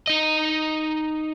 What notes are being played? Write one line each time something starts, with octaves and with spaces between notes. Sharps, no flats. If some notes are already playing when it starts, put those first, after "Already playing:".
D#4 D#5